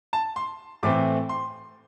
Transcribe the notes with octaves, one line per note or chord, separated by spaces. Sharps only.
A5
C6
A2 E3 A3 C4 D6
C6